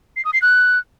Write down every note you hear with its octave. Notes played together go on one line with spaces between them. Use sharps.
C7
D#6
C7
F#6